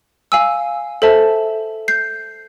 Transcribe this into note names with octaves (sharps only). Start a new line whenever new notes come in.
F5 G#5 E6
A4 C5 E5 A5
G6 C7